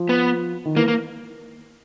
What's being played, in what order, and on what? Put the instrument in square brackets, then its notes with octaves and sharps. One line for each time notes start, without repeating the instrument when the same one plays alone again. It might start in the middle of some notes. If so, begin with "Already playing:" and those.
Already playing: [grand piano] F3
[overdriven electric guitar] B3
[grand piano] D#3
[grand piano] E3 [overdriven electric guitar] A#3
[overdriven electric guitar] A#3